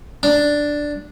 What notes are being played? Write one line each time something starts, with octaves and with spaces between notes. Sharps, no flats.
D4